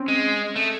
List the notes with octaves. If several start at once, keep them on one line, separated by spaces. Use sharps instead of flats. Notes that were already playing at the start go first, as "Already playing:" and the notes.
Already playing: C4 C#4
G#3
A3